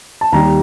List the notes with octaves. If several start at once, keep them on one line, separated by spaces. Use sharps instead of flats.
A5
D#2 D#3 G3 A#5